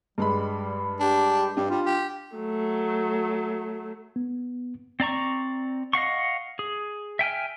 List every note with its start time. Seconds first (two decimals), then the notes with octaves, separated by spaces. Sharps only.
0.18 G2 G3 G#3 B5
1.00 D4 G4
1.57 G2 D4 G4
1.70 G3 F4
1.86 G4
2.36 F#3 A3
4.16 B3
5.00 C4 D5 A#5 C#6
5.93 D#5 F5 F#5 C#6
6.59 G#4
7.19 E5 G5 G#5 F6